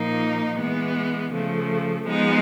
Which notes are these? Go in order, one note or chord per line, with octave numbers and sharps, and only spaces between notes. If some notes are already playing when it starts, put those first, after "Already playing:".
Already playing: A#2 F3 A#3 D#4
E3 G#3 B3
C#3 F3 A3
F3 G#3 B3 D#4